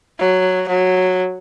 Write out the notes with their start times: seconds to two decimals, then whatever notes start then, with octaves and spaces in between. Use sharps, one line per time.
0.19 F#3
0.69 F#3